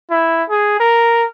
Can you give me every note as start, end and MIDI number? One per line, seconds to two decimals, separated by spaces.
0.10 0.43 64
0.50 0.80 68
0.80 1.25 70